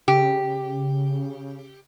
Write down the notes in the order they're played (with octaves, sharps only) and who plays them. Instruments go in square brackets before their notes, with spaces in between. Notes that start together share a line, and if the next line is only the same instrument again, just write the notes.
[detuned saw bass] C#3 [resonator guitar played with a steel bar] G4